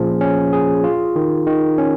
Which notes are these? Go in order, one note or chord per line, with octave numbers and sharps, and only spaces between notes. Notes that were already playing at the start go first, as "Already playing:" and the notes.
Already playing: A#2 F3 C#4 G#4
C#4
G#4
F4
D#3
D#3
C#4